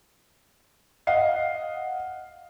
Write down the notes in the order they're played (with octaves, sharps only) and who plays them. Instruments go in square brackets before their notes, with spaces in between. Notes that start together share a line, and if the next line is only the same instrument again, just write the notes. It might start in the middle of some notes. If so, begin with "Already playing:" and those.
[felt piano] D#5 F5 F#5 C7